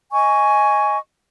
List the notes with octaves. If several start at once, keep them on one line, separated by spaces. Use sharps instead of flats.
D#5 G#5 C#6